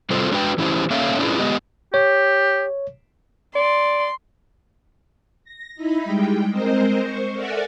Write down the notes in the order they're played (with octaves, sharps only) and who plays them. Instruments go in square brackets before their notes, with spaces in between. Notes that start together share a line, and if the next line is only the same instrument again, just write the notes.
[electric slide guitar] C3 G3 C4 F4 A4 C5
G#3 D4 F#4 B4 G5
E3 C#4 E4 G4 C5
A#3 C#4 A4 C#5 E5 F5
C#4 D4 E4 F4 G#4 B4
G#3 B3 G4 D#5
[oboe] G4 [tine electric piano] C#5
[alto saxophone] D5 [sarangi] C6
[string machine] A#6
D#4 E4 B5
G3 G#3 G5
G#3 C4 A#4 C5 D#5
C5 C#6
A4 A#4 D5 E5 F#5 G#5